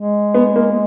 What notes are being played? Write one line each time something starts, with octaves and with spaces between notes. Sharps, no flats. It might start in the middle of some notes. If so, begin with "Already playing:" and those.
Already playing: G#3
B3
A#3